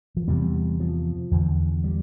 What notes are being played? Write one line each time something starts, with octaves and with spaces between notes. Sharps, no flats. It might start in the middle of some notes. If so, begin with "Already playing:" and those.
F3
E2 C3 G3
F3
E2 D3
G3